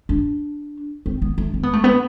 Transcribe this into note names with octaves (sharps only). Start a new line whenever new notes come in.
D4
C4
B3
A3
C4
B3
A3
B3